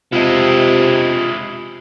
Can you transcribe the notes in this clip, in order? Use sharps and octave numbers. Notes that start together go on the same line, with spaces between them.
C3 G#3 E4 F4 G4 D#5